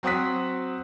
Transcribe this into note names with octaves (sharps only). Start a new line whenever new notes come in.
F#3 C4 F#5 D#6 F#6 B6